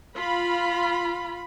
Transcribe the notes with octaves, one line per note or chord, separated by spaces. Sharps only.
F4 B5